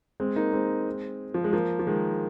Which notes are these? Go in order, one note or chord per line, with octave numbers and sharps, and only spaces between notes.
G#3 C4
A#3 D#4
G#3 C4
F3
G#3
F3 A#3
F3
D#3 G#3